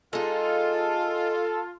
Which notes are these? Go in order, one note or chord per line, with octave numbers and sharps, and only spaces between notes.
G#3 D#4 F4 A4